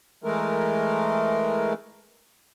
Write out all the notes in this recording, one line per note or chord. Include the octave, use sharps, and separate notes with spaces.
E3 G#3 A3 A#4